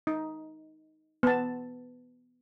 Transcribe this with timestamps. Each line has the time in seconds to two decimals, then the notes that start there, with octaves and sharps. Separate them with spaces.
0.07 D#4
1.23 B3 A5